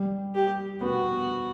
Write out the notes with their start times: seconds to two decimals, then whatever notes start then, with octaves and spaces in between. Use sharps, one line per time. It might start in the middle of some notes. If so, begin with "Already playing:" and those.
Already playing: G3
0.35 G4
0.81 B3 F#4